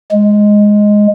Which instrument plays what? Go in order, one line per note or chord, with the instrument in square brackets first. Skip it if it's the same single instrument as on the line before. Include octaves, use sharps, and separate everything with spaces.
[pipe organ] G#3